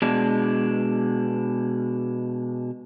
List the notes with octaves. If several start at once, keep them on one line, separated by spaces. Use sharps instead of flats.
B2 G#3 D4